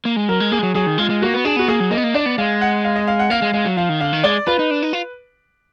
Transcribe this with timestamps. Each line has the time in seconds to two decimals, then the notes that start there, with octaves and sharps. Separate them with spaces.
0.05 A#3
0.16 G#3
0.29 F#3 A#4
0.40 G#3
0.52 A#3 G#4
0.59 G#3
0.63 F#3
0.75 F#3 G#4
0.87 D#3
0.98 G#3 F4
1.10 G#3
1.22 A#3 F#4
1.34 B3
1.45 D4 G#4
1.56 B3 F#4
1.68 A#3 G#4
1.80 F#3
1.91 A#3 D#5
1.97 B3
2.04 A#3
2.14 D4 D5
2.26 B3
2.38 G#3 F5
2.61 F#5
2.84 F5
2.96 D#5
3.07 F5
3.19 F#5
3.30 A#3 F5
3.42 G#3
3.54 G#3 F5
3.66 F#3
3.77 F3 F5
3.89 D#3
4.01 D3 F5
4.13 D#3
4.24 G#3 D5
4.47 F4 B4
4.59 D#4
4.71 D4
4.82 D#4
4.93 F4